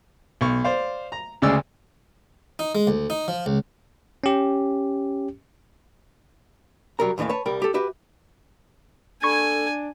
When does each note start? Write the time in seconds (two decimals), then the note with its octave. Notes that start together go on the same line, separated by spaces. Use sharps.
0.41 B1 C#6
0.64 C5 D5 F5
1.12 A#5
1.42 D2 C#3 G#3 D5 E6
2.59 D#4
2.75 G#3
2.87 D2
3.10 D#4
3.28 F3
3.46 C#2
4.24 C#4 G4
6.99 C2 F#3 G3 A#4 A#5
7.18 D#2 A2 E3 D#5 F5
7.29 B4 C#5 A5
7.46 C2 G3 A#4 G5 B5
7.62 G4 A4
7.74 F#4 G4 B4 E5
9.23 D4 A4 G#5 B5 C#6 G#6